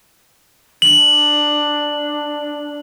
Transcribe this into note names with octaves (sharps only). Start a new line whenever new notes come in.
D4 F#7